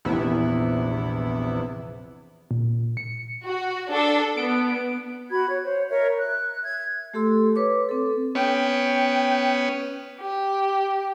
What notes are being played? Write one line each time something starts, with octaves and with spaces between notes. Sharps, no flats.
A#1 E2 C3 B3 E4
A#2
C#7
F#4
D4 A4
B3 D7
F#4 B5 G#6
C#5
C5 C#5
A#4 C#5 D#5 E5
F#6
E5 G#6
A3 G4 A4 C6 E6
B4 C#5 D6
C4 A4
B3 C#4 G5
G4